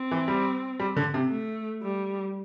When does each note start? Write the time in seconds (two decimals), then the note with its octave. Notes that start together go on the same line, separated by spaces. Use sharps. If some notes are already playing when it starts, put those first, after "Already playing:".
Already playing: C4
0.11 E3
0.28 G3
0.80 G3
0.97 D3
1.14 C3
1.30 A3
1.82 G3